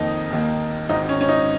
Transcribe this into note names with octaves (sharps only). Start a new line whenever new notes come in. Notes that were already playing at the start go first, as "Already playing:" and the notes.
Already playing: F2 D#3 A#3 D#4
D#2 D#3 A#3
G#1 G#2 D#3 D#4
C#4
C#4
D#4